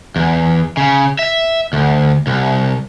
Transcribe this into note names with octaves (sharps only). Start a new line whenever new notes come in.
E2
C#3
E5
D2
C2